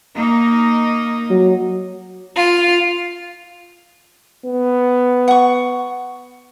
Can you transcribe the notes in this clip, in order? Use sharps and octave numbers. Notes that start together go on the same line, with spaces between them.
A#3 D#4
F#3
F4
B3
F#5 C#6